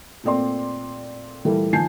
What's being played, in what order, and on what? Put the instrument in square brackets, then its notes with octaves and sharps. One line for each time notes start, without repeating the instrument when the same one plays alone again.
[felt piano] A#2 A3 C4 D5 C6
A#2 E3 G3 A3 A#3 A4
D#3 F3 G#5 A5 G6 C7